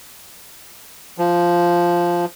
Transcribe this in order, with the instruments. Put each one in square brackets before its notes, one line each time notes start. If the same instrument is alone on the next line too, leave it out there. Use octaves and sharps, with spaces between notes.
[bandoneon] F3